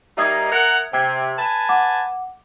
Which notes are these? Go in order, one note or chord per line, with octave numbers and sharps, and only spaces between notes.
G3 A#3 D#4 E5 D#6 G#6
A#4 F#5
C3 G5 G#6
B4 G#5 A5
F#5 D6